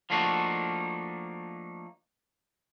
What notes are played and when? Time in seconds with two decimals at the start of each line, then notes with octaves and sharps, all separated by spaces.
0.10 F3 A3 A#3 D4 D#4 F#4